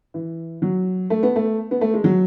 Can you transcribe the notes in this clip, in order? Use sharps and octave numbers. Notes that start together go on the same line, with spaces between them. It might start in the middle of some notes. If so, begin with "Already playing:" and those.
E3
F#3
A3
B3
A3
B3
A3
G#3
F#3